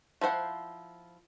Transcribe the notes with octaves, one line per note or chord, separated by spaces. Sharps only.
F3 E4 C5 F#5